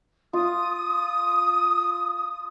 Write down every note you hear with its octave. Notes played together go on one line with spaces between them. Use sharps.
F4 D#6